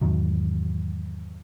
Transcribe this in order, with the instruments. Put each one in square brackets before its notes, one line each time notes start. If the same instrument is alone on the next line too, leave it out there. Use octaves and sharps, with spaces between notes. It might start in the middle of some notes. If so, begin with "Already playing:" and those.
[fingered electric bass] E2 G#2 D#3 F#3